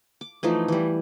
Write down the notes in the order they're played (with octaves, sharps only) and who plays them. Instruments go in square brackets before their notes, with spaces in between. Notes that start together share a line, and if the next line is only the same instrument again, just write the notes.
[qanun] D6
E3 F3 A3 D#4
E3 G3